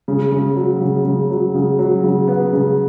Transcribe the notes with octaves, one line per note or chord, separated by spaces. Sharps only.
C#3
C#3
F#3
C#3
C#3
F#3
C#3
F#3
C#3
B3
C#3